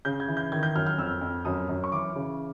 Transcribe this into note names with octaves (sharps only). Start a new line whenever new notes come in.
C#3 G6
G#6
E3
G6
D#3 G#6
G6
F#2 F6
F6
F2 E6
F2
F#2 D#6
F#2
C#6
E3 D6
C#3